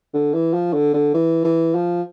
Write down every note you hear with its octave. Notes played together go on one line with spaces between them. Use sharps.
D3
E3
F3
D3
D3
E3
E3
F3